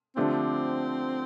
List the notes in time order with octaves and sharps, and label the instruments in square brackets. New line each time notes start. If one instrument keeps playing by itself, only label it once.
[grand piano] D3 F3 A3 D4 G4 [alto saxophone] C4